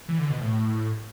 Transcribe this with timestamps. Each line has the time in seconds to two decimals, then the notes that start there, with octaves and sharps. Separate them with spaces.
0.09 E3
0.19 D3
0.30 B2
0.40 A2